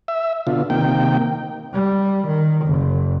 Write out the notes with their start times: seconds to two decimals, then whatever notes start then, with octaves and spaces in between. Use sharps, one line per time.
0.08 E5
0.47 B2 D3 F4
0.70 C3 D#3 A#3 G5
1.73 G3
2.27 D#3
2.66 F#1